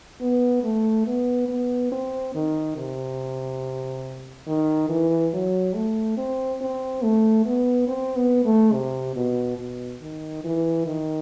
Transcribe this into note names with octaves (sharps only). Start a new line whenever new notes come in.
B3
A3
B3
B3
C4
D#3
C3
D#3
E3
F#3
A3
C4
C4
A3
B3
C4
B3
A3
C3
B2
B2
D#3
E3
D#3